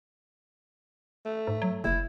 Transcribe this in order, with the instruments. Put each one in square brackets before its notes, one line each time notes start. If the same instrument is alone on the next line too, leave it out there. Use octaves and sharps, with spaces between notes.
[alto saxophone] A3
[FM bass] G#2
F#3
[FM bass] F#1 [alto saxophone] E4